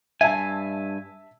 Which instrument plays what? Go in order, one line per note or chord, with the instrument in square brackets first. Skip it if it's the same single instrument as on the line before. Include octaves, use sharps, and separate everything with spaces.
[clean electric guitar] G2 G#5 [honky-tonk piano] E5 A5